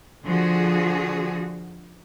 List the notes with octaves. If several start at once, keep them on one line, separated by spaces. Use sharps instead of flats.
D3 F3 F#4 G#4